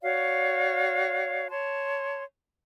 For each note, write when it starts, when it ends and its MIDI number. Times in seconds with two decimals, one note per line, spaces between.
0.03 1.48 66
0.03 1.48 73
0.03 1.48 74
0.03 1.48 77
1.50 2.24 73
1.50 2.24 81
1.50 2.24 84